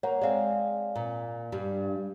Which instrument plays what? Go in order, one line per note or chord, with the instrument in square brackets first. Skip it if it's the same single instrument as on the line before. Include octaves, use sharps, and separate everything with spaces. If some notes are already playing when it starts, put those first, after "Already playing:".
[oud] A#3 [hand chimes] C#5 F#5 A#5
[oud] G#3 C4 [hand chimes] D5 F5 G#5
[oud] A#2
G2 G3